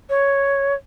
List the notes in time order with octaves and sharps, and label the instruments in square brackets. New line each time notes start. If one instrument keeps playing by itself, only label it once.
[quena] C#5